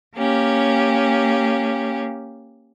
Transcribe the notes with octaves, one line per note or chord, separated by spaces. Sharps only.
A#3 C#4 G4